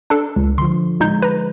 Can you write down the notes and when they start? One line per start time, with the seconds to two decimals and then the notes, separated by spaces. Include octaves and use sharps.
0.10 D4 A4
0.36 C#2
0.58 D3 F3 C6
1.00 A#2 G#3 D#4 G6
1.22 B4 A#5